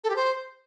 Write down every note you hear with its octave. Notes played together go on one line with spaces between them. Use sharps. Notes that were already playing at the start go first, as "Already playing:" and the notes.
A4
G4
C5